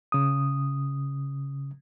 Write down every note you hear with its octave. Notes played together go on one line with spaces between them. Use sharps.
C#3 D#6